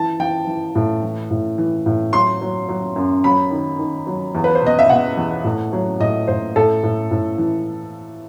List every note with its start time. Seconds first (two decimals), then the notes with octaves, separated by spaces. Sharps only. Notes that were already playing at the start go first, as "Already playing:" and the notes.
Already playing: E3 A5
0.20 E3 G5
0.47 E3
0.75 A2
1.03 E3
1.30 A2
1.58 E3
1.86 A2
2.13 F#3 C6
2.41 F#3
2.69 F#3
2.96 F#2
3.24 F#3 B5
3.51 D#3
3.79 D#3
4.07 F#3
4.35 E2
4.44 B4
4.55 C5
4.62 B2 D#5
4.79 E5
4.89 B2 F#5
5.17 E2
5.44 A2
5.73 F#3
6.00 A2 D#5
6.28 A2 C5
6.56 A2 A4
6.83 A2
7.11 A2
7.38 E3